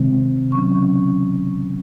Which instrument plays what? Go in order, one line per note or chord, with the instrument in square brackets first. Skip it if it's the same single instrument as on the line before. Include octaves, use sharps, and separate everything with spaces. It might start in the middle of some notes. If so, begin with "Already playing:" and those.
Already playing: [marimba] C3 D#3 G#3 C4
C#3 F#3 C#4 C#6